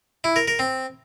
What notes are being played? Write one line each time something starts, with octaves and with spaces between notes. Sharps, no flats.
E4
A#4
A#4
C4